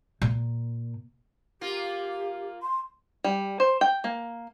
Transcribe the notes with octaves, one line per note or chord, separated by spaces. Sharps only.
A#2
A#3 F4 G4
C6
G3
C5
G5
A#3